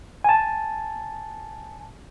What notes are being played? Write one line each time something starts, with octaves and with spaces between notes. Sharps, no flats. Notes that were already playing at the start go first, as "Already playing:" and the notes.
G#5 A5